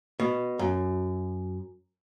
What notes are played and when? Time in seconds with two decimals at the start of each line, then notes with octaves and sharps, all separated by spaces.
0.20 B2
0.59 F#2